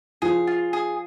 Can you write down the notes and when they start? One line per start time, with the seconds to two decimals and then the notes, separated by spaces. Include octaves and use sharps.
0.22 F3 G#4
0.47 F4
0.73 G#4